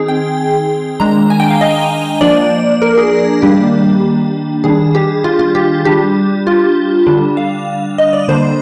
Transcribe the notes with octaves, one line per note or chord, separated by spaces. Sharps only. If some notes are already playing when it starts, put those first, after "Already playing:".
Already playing: D#3 C4 D#4 G#4
G5
D#3 G#3 D4 A#5
G#5
G5
F5
D#5
F3 A#3 D4 D5
A#4
G#4
D#3 G3 A#3 D4 G4
D#3 G3 D4 G#4
G4
F4
F4
G4
G3 D4 G4
F4
D3 G3 D4
F5
D#5
D5
D3 G3 A#3 D4 C5